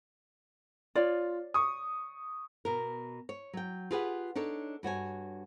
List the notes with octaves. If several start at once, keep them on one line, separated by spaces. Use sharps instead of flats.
F4 C#5 D5
C#6 D#6
B2 A#4
C#5
F#3 G5
F4 G4 G#4 B4 D5 F#5
D4 D#4 A4 C#5
G2 F#4 C#5 G#5